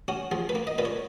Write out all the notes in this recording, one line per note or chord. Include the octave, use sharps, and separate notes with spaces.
C#4 F#4
F3 G#4
B4
A#3
D#5
A#2 B4
C#5